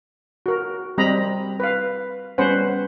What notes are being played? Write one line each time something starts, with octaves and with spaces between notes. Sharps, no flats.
F#4 A#4
G3 C4 D#5 A#5 B5
B4 F5
G3 B3 C#4 B4 C5 F#5